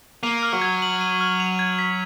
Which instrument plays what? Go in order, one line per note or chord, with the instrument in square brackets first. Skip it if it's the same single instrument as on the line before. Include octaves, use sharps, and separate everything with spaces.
[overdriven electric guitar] A#3 [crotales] D#7
[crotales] F6
[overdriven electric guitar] F#3
[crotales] G#6
F#7
D#7
F6
F7
G#6
B6